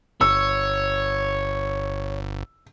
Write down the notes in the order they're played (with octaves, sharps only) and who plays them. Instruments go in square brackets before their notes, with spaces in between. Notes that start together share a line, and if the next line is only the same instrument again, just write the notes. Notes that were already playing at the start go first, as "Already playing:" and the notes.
[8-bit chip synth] G1 [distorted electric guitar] C#5 [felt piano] E6